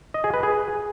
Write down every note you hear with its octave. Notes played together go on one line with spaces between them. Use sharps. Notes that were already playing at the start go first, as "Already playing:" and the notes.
D#5
G#4
B4
G#4